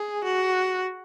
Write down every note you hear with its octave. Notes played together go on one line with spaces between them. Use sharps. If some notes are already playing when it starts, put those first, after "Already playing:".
Already playing: G#4
F#4